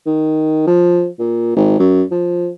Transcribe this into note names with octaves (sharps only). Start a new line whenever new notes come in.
D#3
F3
A#2
G#1
F#2
F3